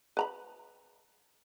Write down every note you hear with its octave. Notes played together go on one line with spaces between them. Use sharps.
B4 A#5 B5